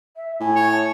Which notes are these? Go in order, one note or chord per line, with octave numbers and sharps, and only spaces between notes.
E5
A2 G#5
C#5
A5